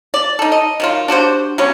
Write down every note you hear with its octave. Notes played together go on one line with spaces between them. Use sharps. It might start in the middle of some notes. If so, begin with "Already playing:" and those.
D5
D#4 A4
D#5
D#3 F#3 F4
D4 F#4 G4 C5
F#3 G3 B3 C#4